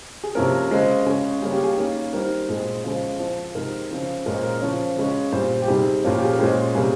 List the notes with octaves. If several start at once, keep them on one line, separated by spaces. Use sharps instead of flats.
G#4
C3 F3 A#3 C#4 A#4
C#3 G#3 C4
C#3 G#3 C#4
C#3 G3 A#3 C#4 G#4
G4
G#4
D#3 A#3 C#4
D#3 G3 C4 A#4
A#2 G#3 C4
C#3 F3 G#3 C5
F3 C4
C3 D#3 G#3 A#4
C#3 F3 C4
A#2 G#3 C#4 A#4
C5
A#4
C#3 F3 C4 C#5
C#3 G#3 C#4
A#2 G3 C4 C5
G4
C3 D#3 G3 C4 G#4
A#2 F3 A#3 C#4
G4
G#4
A#4
A#2 G#3 C#4 C5
C3 G3 A#3 C#4 G#4